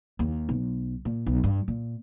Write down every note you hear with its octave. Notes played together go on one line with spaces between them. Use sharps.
D#2
B1
A#2
B1
G2
A#2